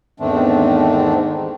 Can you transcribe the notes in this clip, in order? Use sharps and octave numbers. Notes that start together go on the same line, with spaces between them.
E2 G#2 D#3 A3 C4 D4